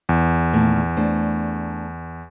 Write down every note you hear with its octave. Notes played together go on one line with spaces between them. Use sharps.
E2
A#2 D#3 A3
A3 D4 C5